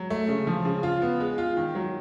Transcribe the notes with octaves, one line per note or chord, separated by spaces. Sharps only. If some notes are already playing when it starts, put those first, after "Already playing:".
Already playing: F#3
A3
C#3
F3
C#3
F4
B3
G#3
F4
D#3
F#3